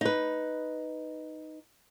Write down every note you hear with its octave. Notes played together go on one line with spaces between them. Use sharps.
D#4 B4